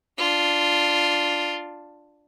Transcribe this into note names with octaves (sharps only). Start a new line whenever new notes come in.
D4 F4